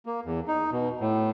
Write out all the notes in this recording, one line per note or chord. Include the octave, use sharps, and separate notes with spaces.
A#3
E2
D#4
B2
A2